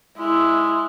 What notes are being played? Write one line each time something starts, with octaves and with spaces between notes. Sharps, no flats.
G#3 E4